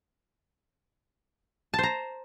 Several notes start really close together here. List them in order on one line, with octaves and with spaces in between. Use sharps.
A5 C5 A#5